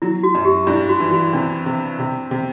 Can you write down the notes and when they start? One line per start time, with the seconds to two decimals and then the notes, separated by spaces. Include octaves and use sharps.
0.02 F#3 E4
0.23 F#4
0.35 F#2
0.45 G4
0.67 G2 E4
0.89 F#4
1.00 E3
1.11 F#4
1.33 C3 D4
1.66 C3
1.99 C3
2.31 C3